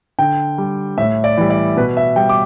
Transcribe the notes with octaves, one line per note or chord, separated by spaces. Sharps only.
D3 G5
G3
A2 E5
D5
E3 G3
D5
B2 B4
E5
G3 G5
D6